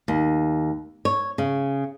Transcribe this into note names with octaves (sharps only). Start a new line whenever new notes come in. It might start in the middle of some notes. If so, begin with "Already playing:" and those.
D#2
C#5
C#3